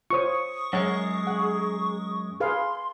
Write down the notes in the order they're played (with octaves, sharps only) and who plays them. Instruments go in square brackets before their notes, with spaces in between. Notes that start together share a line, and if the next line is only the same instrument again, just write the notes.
[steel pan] F4 C5 C#5 [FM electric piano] C#6 D#6
[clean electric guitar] F#2 G#3 [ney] G#4 [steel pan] C#5 F#5
[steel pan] F#5
[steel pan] G#4 B4 F5 [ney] C6